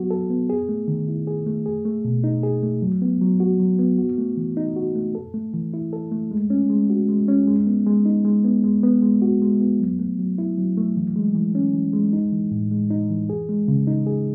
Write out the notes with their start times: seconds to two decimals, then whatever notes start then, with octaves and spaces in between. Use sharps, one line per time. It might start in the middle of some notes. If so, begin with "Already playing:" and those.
Already playing: F#3 B3 F#4
0.11 A4
0.30 B3
0.50 G#4
0.69 A3
0.88 D#3
1.08 E4
1.27 G#4
1.46 A3
1.66 G#4
1.85 A3
2.05 B2
2.24 D#4
2.43 G#4
2.63 A3
2.82 F#3
3.02 B3
3.21 F#3
3.40 F#4
3.60 F#3
3.79 B3
3.98 F#4
4.18 A3
4.37 E3
4.57 D#4
4.76 F#4
4.95 A3
5.15 A4
5.34 A3
5.54 E3
5.74 E4
5.93 A4
6.12 A3
6.31 G#3
6.50 C#4
6.70 G#3
6.90 F#4
7.09 G#3
7.28 C#4
7.47 G#3
7.67 B3
7.86 G#3
8.06 D#4
8.25 G#3
8.44 B3
8.64 G#3
8.83 B3
9.03 G#3
9.22 F#4
9.42 G#3
9.61 B3
9.80 F#3
9.99 A3
10.19 F#3
10.38 E4
10.58 F#3
10.77 A3
10.97 E3
11.16 G#3
11.35 E3
11.55 C#4
11.74 E3
11.93 G#3
12.13 D#4
12.32 E3
12.51 A2
12.71 G#3
12.91 D#4
13.10 E3
13.30 G#4
13.49 G#3
13.68 C#3
13.87 D#4
14.07 G#4